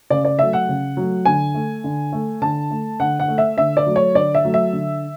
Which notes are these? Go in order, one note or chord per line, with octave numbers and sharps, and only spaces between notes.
C#3 D5
D5
F#3 A3 E5
F#5
C#3
F#3 A3
D3 G#5
A3
D3
A3
D3 A5
A3
D3 F#5
F#5
A3
E5
D3 E5
D5
F#3 A3
C#5
D3 D5
E5
F#3 A3
E5
D3